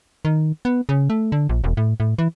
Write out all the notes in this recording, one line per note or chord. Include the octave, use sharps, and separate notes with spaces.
D#3
B3
C#3
A3
D3
A#1
E1
A2
A2
E3